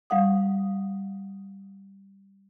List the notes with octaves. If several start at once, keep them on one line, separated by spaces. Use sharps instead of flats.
G3 F5 F#5 D#6